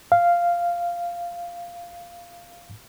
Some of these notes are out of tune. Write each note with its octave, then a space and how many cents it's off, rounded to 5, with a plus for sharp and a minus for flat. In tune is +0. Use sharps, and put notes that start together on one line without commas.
F5 -5